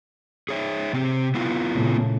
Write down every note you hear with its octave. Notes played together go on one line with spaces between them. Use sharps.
G#4 C#5 E5
C3 C4 G4
B3 E4 F4
A#2 C#3 A3